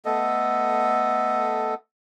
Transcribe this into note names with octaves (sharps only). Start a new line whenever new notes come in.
A3 B3 A4 D#5